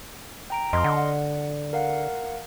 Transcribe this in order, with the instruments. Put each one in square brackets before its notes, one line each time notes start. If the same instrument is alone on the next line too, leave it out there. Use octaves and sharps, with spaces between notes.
[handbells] G5 A#5 D7
[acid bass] F2 [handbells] D#5 C6 F6
[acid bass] D3 [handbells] F#5
[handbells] A#4 F5 F#5